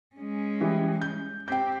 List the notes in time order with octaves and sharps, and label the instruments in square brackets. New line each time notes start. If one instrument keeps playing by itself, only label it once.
[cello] G#3 C#4
[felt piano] E3 G3
G6
[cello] C4 G4 [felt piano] G5 G6